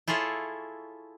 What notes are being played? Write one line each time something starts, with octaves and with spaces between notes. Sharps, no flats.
E4 F4 G#4 A4 C#5